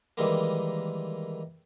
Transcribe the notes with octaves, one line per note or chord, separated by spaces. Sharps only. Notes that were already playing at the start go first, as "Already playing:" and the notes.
D#3 E3 G3 G#3 A#3